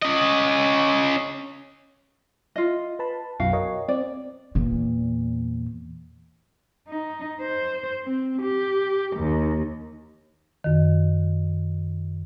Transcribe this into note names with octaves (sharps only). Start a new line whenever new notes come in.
C#4 D#5
F4 D#5
B4 A5 B5
B1 F#2 B2 F#4 F5 G5
A#4 C#5 D#5
C4 D5
E2 A#2
D#4
C5
C4
G4
D#2
F#2 D#3